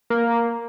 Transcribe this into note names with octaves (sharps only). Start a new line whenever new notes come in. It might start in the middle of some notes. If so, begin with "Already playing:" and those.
A#3